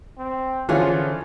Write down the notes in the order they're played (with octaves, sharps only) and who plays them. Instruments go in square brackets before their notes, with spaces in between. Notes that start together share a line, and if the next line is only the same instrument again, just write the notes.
[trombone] C4
[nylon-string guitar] D3 C#4 G#4 [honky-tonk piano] E3 F4 [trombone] F3